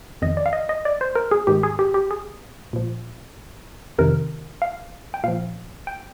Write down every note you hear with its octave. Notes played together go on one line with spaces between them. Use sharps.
F2 D#3 D#5
D5
F5
D#5
D#5
D5
C5
A#4
G#4
G#2 D#3 G4
G#4
G4
G4
G#4
A#2 F3
F2 C3 D#3 A#4
F5
G5
A#2 F3 F5
G5